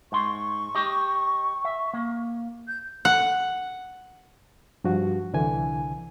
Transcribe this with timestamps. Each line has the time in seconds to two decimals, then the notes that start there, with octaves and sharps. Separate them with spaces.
0.12 G#2 C6 C#6
0.75 G4 D#5
1.65 E5
1.94 A#3
2.68 G6
3.05 F#5
4.84 G2 F3 F#4
5.33 C2 D3 E3 G#5